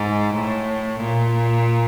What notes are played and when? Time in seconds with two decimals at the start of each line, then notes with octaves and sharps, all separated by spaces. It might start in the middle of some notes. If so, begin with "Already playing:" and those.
Already playing: G#2
0.34 A2
1.00 A#2